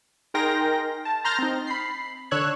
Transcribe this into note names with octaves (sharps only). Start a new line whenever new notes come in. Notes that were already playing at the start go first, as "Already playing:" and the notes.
D#4 G#4 A#4 G5 C6 A#6
A5
A#5 C6 F6 G6 A6 A#6
C4 D#4
B5 C7
D3 D4 C#5 E6 F#6 G#6